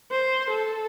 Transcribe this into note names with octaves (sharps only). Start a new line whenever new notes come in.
C5
A4